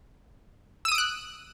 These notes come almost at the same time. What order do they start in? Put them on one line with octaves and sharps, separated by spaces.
E6 D#7 D#6 D7 F#6